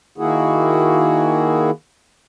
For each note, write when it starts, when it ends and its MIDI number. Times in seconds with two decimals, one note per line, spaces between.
0.18 1.71 51
0.18 1.71 58
0.18 1.71 64
0.18 1.71 66
0.18 1.71 68